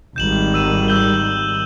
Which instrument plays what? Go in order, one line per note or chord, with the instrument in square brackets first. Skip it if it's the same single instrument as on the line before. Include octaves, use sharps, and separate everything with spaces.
[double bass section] G#1 D#3 G3 [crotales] G6 E7 F#7
[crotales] E6 D#7 E7
E6 G6 G7